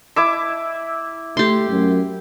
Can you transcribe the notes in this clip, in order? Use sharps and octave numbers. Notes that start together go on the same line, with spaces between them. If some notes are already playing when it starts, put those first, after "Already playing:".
E4 D6 E6
A3 G4 C6
F#2